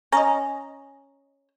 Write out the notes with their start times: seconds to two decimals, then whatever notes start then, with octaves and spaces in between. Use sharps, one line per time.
0.12 C#4 D#5 A#5